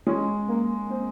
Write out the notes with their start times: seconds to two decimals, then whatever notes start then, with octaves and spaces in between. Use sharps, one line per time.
0.07 G#3 C#4
0.48 A#3
0.90 C4